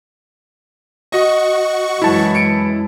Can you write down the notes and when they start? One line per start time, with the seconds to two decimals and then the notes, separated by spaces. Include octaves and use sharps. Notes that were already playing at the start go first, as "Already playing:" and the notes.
1.12 F#4 D#5 C#6
2.02 F#2 E3 G#3 E4 A5
2.35 C#7 D7